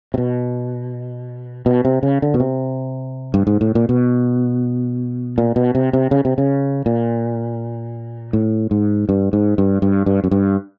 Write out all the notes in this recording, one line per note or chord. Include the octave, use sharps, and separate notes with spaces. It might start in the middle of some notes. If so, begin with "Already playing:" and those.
C3
B2
B2
C3
C#3
D3
B2
C3
G2
G#2
A2
A#2
B2
A#2
B2
C3
C3
C#3
C3
C#3
A#2
A2
G#2
G2
G#2
G2
G2
G2
F#2
G2